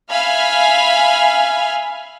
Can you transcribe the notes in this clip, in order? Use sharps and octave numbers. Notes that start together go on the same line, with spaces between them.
E5 F5 G#5 B5 F6